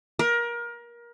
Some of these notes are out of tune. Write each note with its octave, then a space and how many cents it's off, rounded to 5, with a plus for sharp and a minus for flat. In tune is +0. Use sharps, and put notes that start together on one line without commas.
A#4 +25